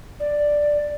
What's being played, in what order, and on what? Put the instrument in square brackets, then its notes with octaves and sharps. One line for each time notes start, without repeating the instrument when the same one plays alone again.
[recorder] D5